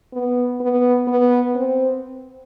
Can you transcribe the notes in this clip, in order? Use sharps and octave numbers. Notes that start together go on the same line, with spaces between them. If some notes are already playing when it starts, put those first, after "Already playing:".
B3
B3
B3
C4